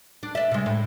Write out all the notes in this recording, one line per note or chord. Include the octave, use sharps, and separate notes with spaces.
D4
D5 E5
C3 G#3
A2